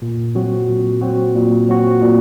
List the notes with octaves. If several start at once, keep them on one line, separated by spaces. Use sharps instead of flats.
A#2
F#3 C4 F#4
A#2
F#3 C4 F#4
A#2
F#3 C4 F#4
A#2